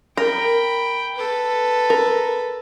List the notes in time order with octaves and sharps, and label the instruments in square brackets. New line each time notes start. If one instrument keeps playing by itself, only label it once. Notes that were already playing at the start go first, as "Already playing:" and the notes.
[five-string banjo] A#4 [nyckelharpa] G5 B5
[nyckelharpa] A4 B4
[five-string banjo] A#4